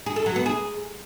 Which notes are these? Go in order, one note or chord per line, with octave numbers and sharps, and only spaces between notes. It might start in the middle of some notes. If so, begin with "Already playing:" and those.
G#4
A4
F#3
B3
G#4